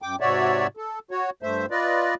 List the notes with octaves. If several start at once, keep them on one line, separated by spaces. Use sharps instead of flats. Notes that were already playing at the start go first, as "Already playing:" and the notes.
F#2 G5 D6
G#2 C3 F#4 C#5 D5 E5
A4
F#4 C#5
G2 A3 C5 E5
F4 B4 D5 D#5